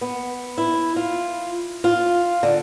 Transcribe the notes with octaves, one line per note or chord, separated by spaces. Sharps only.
B3
E4
F4
F4
D3